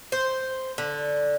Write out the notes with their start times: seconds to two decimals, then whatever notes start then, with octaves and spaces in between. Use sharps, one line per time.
0.12 C5
0.78 D3